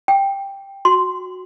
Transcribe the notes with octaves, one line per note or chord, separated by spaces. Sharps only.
G5
F#4 C6